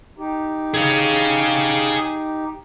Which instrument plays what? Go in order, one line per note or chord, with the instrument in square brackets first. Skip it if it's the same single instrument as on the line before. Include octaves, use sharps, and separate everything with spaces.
[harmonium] D#4 G4
[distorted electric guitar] G#4 F5